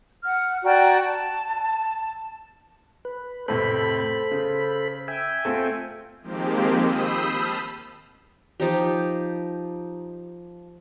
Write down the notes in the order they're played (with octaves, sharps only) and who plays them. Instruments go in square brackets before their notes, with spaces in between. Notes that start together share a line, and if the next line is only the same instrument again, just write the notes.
[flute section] F#5 F6
F#4 D5 G5 A#5
A5
[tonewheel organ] B4
[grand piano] F2 A2 C3 [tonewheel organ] A4 C5 B5
[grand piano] C#3
[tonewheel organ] E5 G5 G#5
[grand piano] A3 C4 F4
[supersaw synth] D#3 F3 G#3 A#3 C4 G4
B5 D#6 E6 G6 C7
A5 F6 B6
[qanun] F3 D#4 G4